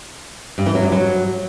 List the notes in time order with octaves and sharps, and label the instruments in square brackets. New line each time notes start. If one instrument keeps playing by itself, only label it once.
[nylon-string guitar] G2
E3
F#3
G2
F#3